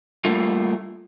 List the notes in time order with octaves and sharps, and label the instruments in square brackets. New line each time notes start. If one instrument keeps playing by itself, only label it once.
[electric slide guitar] G3 A3 A#3 F4